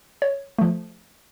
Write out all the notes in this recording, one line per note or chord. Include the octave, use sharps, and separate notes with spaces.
C#5
F3 A3